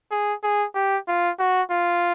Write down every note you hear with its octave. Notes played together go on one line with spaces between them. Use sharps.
G#4
G#4
G4
F4
F#4
F4